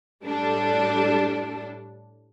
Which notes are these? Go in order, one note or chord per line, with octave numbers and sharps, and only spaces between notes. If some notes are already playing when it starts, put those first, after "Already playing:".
A2 G3 D4 A4